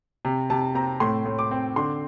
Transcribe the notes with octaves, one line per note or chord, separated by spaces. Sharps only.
C3
C3 A5
C4 A#5
A2 C6
A2
D6
C4
D3 C6